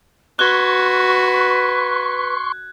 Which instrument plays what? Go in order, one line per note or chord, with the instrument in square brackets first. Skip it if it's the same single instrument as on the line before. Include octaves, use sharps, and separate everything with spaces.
[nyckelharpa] F#4 [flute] B4 [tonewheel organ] C6 C#6 [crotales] F#6 G#6